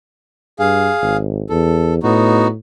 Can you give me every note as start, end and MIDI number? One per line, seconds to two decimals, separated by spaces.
0.59 0.90 43
0.59 1.17 68
0.59 1.17 77
1.01 1.43 32
1.50 2.01 40
1.50 1.94 69
2.03 2.55 45
2.03 2.47 59
2.03 2.47 63
2.03 2.47 66